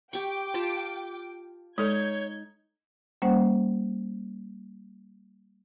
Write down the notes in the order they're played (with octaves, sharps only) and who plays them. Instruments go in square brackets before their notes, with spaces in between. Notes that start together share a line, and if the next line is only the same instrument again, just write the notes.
[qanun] G4 C#6 [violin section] G5 D6
[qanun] F4 G4 A5
[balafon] G#3 A4 [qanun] D#4 [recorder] C#5 [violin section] G6 G#6
[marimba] G3 A#3 C#4 C5 F#5